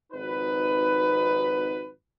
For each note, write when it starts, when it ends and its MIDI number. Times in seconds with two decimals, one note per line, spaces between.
0.13 1.91 32
0.13 1.91 41
0.13 1.91 63
0.13 1.91 66
0.13 1.91 71